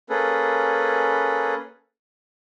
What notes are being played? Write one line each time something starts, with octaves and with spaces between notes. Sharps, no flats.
A#3 C#4 G#4 A4 B4